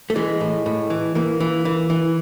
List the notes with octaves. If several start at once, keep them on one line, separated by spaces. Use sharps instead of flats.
A3
E3 G#3
A2
A2
E3
E3 A#3
E3
E3
E3